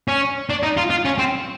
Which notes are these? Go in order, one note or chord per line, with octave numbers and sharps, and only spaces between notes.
C#4
D4
D#4
F4
F4
C#4
C4